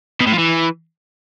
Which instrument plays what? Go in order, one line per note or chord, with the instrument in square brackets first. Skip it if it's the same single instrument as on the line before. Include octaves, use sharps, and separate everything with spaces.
[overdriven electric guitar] B2
A2
F3
E3